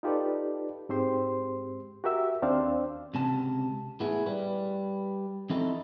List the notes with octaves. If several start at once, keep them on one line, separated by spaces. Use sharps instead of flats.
D#4 F4 G4 A4 B4 D5
G#2 G#3 C4 G4 C5 C6
F#4 G4 A#4 E5 E6
D#2 C4 D4 C5 D5 F5
C#2 C3 A5
A2 B3 E4 G#4
G3 B4
F3 C4 D#4 E4 A4 D#5